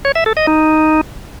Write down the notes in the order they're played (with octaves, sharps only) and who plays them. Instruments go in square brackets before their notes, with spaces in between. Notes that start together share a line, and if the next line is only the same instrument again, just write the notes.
[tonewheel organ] C#5
E5
A4
D#5
D#4